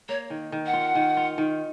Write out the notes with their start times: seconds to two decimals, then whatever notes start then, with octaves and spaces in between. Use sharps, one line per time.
0.08 A#3 C#5
0.30 D#3
0.52 D#3
0.66 F#5
0.73 F4
0.95 D#3
1.17 F4
1.38 D#3